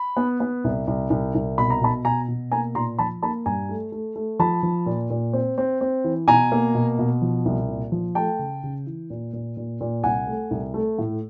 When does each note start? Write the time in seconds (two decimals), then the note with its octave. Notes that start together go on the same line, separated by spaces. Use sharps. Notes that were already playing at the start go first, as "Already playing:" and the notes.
Already playing: B5
0.17 B3
0.40 B3
0.64 C2
0.87 C2
1.10 C2
1.35 C2
1.58 B2 B5
1.70 A#5
1.81 B2 A5 B5
2.05 B2 G#5 A#5
2.28 B2
2.52 A#3 G#5 A#5
2.75 A#2 A#5 C6
2.98 F3 A5 B5
3.23 A#3 A5 B5
3.46 G2 G#5 A#5
3.69 A3
3.92 A3
4.16 A3
4.39 F3 A5 B5
4.63 F3
4.86 A#2
5.10 A#2
5.33 C4
5.58 C4
5.81 C4
6.04 E3
6.27 B2 G#5 A#5
6.52 A#3
6.75 B2
6.99 B2
7.22 F3
7.45 C2
7.68 A#2
7.92 F3
8.15 A3 G5 A5
8.39 C#3
8.63 C#3
8.86 E3
9.10 A#2
9.33 A#2
9.57 A#2
9.81 A#2
10.04 C2 F#5 G#5
10.27 A3
10.51 C2
10.74 A3
10.98 A2